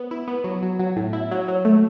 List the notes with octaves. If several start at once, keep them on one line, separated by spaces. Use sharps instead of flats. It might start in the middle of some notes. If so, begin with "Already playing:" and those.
Already playing: B3
E4
B3
F#3
F#3
F#3
A2
E4
F#3
F#3
A3